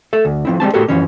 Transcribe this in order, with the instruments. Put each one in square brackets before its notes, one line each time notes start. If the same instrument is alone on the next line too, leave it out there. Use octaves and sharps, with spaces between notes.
[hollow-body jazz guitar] A4 E5
D2
F3 C4 E4
G3 G#3 C4 A5
A2 F#4 G4 A4 A#4
F#2 E3 F3 C#4